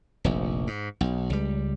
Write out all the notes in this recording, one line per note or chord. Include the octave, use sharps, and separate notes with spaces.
F1 A#1
G#2
B1
C#2 G3